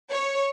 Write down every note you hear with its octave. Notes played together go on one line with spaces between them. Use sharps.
C#5